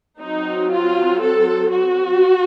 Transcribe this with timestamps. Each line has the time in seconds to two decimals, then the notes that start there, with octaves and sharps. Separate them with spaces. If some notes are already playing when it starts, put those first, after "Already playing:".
0.20 F#3 C4 D#4
0.70 F4
1.19 A4
1.69 F#4